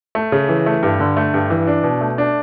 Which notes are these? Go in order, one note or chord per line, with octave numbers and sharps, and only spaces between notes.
A3
C#3
E3
A3
G2
D3
A3
G2
E3
D4
B2
A3
D4